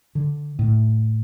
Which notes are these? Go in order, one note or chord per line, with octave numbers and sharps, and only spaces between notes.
D3
A2